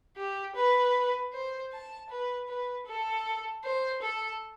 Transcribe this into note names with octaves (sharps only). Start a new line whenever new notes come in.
G4
B4
C5
A5
B4
B4
A4
C5
A4